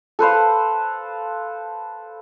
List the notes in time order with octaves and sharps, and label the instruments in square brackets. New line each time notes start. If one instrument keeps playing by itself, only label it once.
[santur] A4 B4 C5 F5